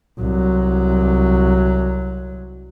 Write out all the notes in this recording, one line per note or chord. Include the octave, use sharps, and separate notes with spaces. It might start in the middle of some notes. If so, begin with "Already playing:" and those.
C2 F#3